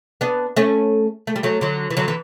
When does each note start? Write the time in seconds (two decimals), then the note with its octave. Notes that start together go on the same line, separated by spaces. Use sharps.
0.21 B3 D4
0.57 A3 C#4
1.27 A3
1.36 G3
1.43 F#3 A3
1.61 D3 F#3
1.90 E3
1.97 D3 F#3
2.08 E3